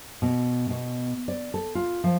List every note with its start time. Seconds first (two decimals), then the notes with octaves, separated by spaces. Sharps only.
0.22 B2
0.70 B2
1.28 D5
1.54 A4
1.75 F4
2.04 F3